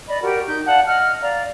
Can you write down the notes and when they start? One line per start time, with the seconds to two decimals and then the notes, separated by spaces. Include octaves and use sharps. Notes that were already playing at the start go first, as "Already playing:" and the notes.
0.08 D5 D#5 B5
0.23 F#4 G4 A#4
0.47 D#4 G6
0.67 D5 F5 F#5 A5
0.87 D#5 F#5 F6
1.21 D5 F5 A#5